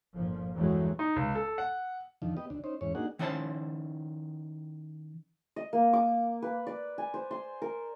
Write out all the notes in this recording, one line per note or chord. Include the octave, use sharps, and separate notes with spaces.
G1 A#2 F3
E2 G2 E3 F#3 G#3 A3
D#4
C#2
A4
F#5
F2 D3 D#3 F3
B3 G4 D#5
D2 D4
C#4 D#4 C5
E2 G#2 C#4 C#5
A#3 D4 D#4 F#4 G#4 F#5
D#3 C#4 E4 C5 C#5 A5
D#5
A#3
D6
B4
D5
G#5
C5
C6
A#4